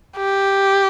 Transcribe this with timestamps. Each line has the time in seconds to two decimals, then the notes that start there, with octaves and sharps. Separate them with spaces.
0.17 G4